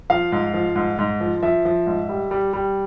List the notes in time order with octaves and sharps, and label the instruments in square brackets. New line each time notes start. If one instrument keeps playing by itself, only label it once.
[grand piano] F3 F5
G#2
F3
G#2
G#2
F3
F3 E5
F3
G#2
G3
G3
G3